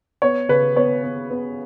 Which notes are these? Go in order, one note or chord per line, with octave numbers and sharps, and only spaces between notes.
B3 C#5
C#3 B4
B3 C#5
B3
B3